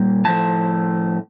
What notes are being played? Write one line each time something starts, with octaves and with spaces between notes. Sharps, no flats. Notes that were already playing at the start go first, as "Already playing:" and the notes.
Already playing: A#2 G3 A#3
A2 F3 A3 A5